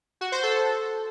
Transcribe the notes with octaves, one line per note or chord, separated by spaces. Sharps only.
F#4
C5
A4